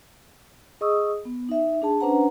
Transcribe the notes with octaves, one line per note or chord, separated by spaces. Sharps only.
G#4 D#5 C#6 D#6 E6
B3
D#4 E5
D4 G#4 A5
C#4 D4 B4 C5 F#5 A#5